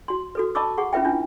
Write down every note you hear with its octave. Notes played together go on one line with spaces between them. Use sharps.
F#4 C6
F#4 A4 B4
D#5 A5 B5 C#6 D6 E6
G#4 F#5 C#6
C#4 F4 B4 E5 G5
C#4 D4 E4 F4